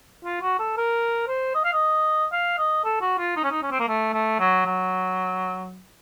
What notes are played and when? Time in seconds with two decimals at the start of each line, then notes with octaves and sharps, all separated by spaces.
0.24 F4
0.42 F#4
0.59 A4
0.77 A#4
1.28 C5
1.55 D#5
1.64 F5
1.73 D#5
2.32 F5
2.58 D#5
2.84 A4
3.01 F#4
3.18 F4
3.36 D#4
3.44 C#4
3.51 D#4
3.62 C#4
3.71 C4
3.79 A#3
3.88 A3
4.13 A3
4.40 F#3
4.66 F#3